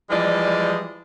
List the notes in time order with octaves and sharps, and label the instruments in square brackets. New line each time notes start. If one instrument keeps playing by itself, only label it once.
[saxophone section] E3 F3 G3 G#3 D5 D#5